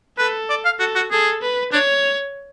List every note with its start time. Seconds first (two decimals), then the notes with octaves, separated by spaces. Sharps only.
0.18 A4 B4
0.50 D5
0.65 F5
0.79 F#4 A4
0.95 F#4
1.11 G#4 A4
1.42 B4
1.72 D4 C#5